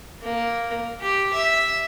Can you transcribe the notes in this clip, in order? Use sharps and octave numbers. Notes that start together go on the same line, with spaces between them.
A#3
G4
E5